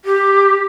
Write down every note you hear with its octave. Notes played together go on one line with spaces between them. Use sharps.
G4